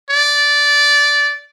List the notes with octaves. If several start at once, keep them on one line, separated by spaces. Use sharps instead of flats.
D5